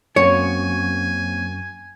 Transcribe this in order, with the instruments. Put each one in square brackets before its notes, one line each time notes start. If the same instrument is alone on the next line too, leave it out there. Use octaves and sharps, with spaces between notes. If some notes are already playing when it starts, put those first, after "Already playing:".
[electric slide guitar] F#2 [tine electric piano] A#3 C4 C#4 [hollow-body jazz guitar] C#5 [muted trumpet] G#5